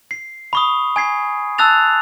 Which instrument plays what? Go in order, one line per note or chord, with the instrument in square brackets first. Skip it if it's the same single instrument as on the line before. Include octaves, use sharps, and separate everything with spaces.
[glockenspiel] C7
B5 C#6 D#6
G#5 G#6 C7
A5 E6 F#6 A6 F7